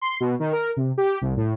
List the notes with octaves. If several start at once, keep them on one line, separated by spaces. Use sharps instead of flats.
C6
B2
D#3
A#4
C3
G4
C2
A2